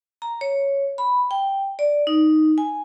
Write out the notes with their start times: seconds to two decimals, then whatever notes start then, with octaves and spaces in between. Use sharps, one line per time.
0.22 A#5
0.41 C#5
0.98 B5
1.31 G5
1.79 D5
2.07 D#4
2.58 G#5